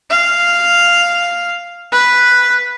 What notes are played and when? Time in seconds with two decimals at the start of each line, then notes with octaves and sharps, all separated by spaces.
0.10 F5
1.92 B4